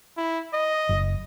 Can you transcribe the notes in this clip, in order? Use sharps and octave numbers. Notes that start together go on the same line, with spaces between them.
E4
D#5
F#1